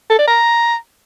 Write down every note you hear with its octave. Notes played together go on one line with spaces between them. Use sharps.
A4
D5
A#5